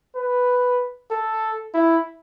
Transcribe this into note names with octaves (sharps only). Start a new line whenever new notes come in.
B4
A4
E4